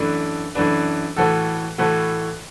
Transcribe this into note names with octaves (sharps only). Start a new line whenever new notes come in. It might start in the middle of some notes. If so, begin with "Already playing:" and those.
Already playing: F#2 E3 A3 D4 B4
F#2 E3 A3 D4 B4
A2 E3 A3 F#4 A4
A2 E3 A3 F#4 A4